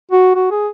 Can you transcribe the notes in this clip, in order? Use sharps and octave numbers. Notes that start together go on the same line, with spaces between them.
F#4
F#4
G#4